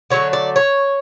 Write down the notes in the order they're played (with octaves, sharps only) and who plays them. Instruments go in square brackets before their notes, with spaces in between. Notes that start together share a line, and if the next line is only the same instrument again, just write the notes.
[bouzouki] D3 F#3 A3 C#5
D5
C#5